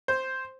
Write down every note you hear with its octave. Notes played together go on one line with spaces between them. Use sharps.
C5